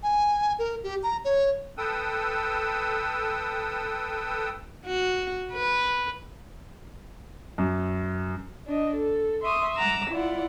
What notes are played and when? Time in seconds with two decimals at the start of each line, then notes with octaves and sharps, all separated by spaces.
0.03 G#5
0.59 A#4
0.84 G4
1.03 A#5
1.25 C#5
1.78 A4 B4 G5 D#6 E6
4.86 F#4
5.54 B4
7.58 F#2
8.67 D4 D#5
8.96 A4
9.42 E5 C6 C#6 D#6
9.75 F#5 A#5 D6 E6
10.10 E4 F4 D5 F#5